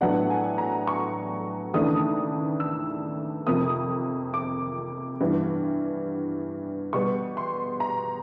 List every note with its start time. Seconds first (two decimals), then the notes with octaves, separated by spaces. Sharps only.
0.01 A2 F#3 B3 D4 F#5
0.30 G#5
0.58 A#5
0.87 C#6
1.74 D#2 C#3 E3 A3 D4 D#6
2.60 E6
3.47 F2 C3 F3 A#3 D#6
4.34 D6
5.20 G2 E3 G3 B3
6.93 B2 G3 B3 C#6
7.37 C6
7.80 A#5